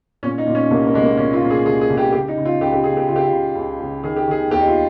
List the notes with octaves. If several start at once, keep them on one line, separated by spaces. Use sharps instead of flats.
A#2 C#4
D#4
A#2
C#4
C2 A#3
A#3
C2 G#3
A#3
A#2 C#4
F4
A#2
G#4
C2 G#4
G#4
C2
G4
C#3 G4
D#4
C#3
F4
C#2 G4
G4
C#2 G#4
G4
C#3 F4
G4
F4
C#3
C#2
C#2
D#3 G#4
G4
D#3 G#4
D#2 G4
D#4
F4